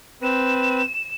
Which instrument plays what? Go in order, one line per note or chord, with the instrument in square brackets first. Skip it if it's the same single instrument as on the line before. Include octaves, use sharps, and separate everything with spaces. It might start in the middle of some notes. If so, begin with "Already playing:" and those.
[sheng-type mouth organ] C4 B4 [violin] E7